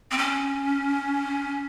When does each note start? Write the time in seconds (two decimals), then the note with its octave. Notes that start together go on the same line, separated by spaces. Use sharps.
0.11 C4
0.18 C#4